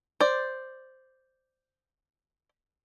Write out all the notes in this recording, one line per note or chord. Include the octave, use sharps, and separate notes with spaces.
C5 D5